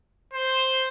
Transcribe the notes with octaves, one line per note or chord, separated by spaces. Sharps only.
C5